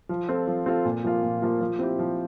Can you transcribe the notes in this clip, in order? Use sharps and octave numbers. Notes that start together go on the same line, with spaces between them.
F3
C4 F4 A4
F3
C4 F4 A4
A#2
F3 A#3 F4
A#2
F3 A#3 F4
F3
C4 E4 G4
F3